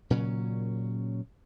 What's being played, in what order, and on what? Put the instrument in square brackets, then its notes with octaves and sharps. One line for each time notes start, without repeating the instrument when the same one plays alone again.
[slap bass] A#2 C#3 F#3 C#4